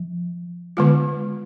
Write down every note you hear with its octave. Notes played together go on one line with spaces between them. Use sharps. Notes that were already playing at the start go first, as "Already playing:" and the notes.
Already playing: F3
D3 G#3 B3 F4